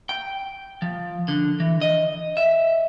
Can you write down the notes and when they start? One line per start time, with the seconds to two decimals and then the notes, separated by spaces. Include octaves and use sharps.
0.09 G5
0.82 F3
1.28 D3
1.60 E3
1.81 D#5
2.37 E5